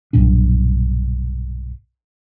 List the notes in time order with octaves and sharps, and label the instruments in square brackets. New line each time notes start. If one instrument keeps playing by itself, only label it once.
[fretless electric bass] B1 G2 A#2 D4